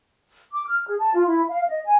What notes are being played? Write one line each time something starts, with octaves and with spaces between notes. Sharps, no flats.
D6
F6
G#4
A5
F4
E4
F5
D#5
G#5